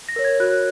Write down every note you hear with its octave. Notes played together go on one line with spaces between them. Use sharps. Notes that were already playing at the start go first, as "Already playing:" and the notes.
A#6
A#4 C#5
G#6
F#4 F#6